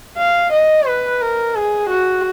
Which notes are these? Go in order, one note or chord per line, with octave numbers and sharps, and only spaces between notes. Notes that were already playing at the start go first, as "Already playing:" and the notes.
F5
D#5
B4
A#4
G#4
F#4